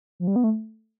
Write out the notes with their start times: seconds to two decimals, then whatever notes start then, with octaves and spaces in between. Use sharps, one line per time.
0.20 F3
0.27 G3
0.36 B3
0.44 A3